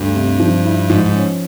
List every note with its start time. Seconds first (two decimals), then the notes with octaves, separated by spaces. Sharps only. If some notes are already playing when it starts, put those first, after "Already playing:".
Already playing: D2 G2
0.14 C3
0.40 F3
0.65 E4
0.90 G#2 F3
1.06 G#2
1.15 C#4